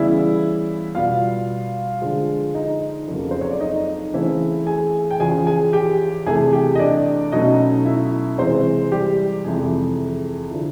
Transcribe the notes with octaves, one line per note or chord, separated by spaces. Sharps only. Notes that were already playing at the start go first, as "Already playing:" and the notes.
Already playing: C#3 E3 G3 B3 E4 E5
B2 G3 B3 F4 F5
D3 F3 G#3
D#4 D#5
F2 C#3 F#3 A#3
C5
C#5
D5
D#4 D#5
C#3 E3 A3 C4 E4 E5
G#4 G#5
G5
E2 C#3 F3 G#4 G#5
G#4 G#5
G4 G5
C3 E3 A3 G#4 G#5
G4 G5
D#5
D4 D5
B2 F#3 A3 C#4 D#4 D#5
E4 E5
C3 E3 G#3 C4 C5
G3 G4
F2 C3 E3 G#3 G#4
D3 F3 E4